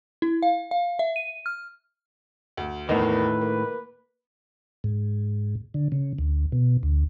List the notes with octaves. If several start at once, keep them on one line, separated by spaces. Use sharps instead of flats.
E4
F5
F5
E5
D#7
F6
D2
E2 A2 D#3 A#3 B4 D#5
A#3
G#2
D3
C#3
D2
B2
D2